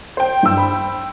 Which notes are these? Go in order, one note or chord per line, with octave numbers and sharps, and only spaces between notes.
C5 G5
G2 E6
B5